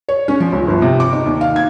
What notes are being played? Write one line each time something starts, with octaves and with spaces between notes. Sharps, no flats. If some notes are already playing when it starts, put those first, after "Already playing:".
C#5
C#4
F3
C#2
G1
C3
D6
D#4
D#2
F5
G#6